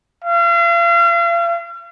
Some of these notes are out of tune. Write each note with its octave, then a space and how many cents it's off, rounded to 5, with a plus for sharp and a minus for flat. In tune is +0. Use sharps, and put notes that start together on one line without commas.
F5 -40